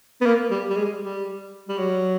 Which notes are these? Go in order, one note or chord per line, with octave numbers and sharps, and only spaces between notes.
B3
A#3
G3
G3
G#3
G3
G3
F#3